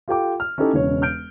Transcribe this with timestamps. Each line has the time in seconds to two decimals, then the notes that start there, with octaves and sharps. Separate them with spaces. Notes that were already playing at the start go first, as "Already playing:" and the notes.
0.08 F4 G4 A4 G5 D6
0.40 F6
0.58 C#4 D#4 E4 G4 A4 C#5
0.73 E1 C#3 C#5
1.02 F6 G6 D7